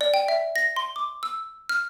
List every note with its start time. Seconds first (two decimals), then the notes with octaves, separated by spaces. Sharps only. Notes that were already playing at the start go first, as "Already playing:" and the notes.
0.01 D5
0.14 G5
0.28 E5
0.56 A#6
0.76 C6
0.96 D6
1.23 E6
1.69 F6